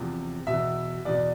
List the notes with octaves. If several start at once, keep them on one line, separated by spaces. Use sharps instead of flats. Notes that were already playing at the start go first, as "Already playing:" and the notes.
Already playing: E2 C3 F3
E2 B2 E5
E2 B2 D5